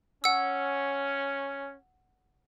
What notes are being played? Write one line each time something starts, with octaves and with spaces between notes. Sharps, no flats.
C#4 F#5 E6